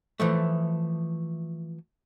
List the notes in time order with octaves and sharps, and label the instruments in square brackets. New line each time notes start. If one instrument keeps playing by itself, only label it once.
[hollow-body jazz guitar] E3 F3 A3